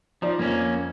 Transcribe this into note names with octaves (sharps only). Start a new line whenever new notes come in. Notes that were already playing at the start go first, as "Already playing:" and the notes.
F3 D#4 D5
F2 A#3 C#4